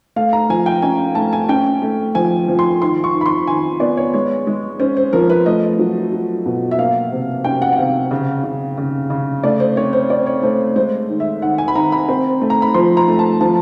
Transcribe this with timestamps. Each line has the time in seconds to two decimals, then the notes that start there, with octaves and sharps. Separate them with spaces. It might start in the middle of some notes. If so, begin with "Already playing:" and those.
0.16 A3 F5
0.33 A#5
0.49 F3 G#5
0.66 G5
0.82 C#4 G#5
1.15 A3 A5
1.33 G#5
1.49 C#4 G5
1.82 A3
2.15 F3 G#5
2.48 F3
2.59 C6
2.82 D#3 C6
3.04 C#6
3.14 D#3
3.21 B5
3.26 C6
3.47 D#3 G#5
3.80 B3 D5
3.97 C#5
4.14 G#3 C#5
4.47 G#3
4.79 C#4 C5
4.97 C5
5.13 F3 A#4
5.30 B4
5.46 A3 D#5
5.79 F#3
6.12 F#3
6.46 B2
6.71 E5
6.79 A#3 F5
7.12 C3
7.44 C#4 G5
7.62 F#5
7.73 F#5
7.78 C3 F5
8.11 C#3
8.44 C#3
8.78 C#3
9.10 C#3
9.44 A3 D5
9.60 C5
9.77 C4 C#5
9.93 C5
10.10 C4 D5
10.27 C#5
10.43 A3 C5
10.76 G#3 C5
11.09 D#3
11.20 E5
11.42 D#3 F#5
11.58 G#5
11.68 B5
11.75 D#3 A#5
11.92 B5
12.09 C4
12.41 A3
12.50 A#5
12.62 B5
12.74 F3 C6
12.97 A#5
13.08 A3
13.19 A5
13.41 F3 A5